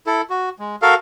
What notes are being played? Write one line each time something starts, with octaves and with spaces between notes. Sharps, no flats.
E4 A4
F#4
G#3
F#4 A4 A#4 F5